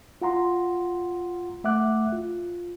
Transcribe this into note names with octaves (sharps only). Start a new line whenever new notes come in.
F4 F#5 A#5 C6
A3 E5 F#5 D6 F#6
F4